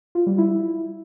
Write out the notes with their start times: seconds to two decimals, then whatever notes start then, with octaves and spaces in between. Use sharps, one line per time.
0.15 F4
0.27 G3
0.38 E4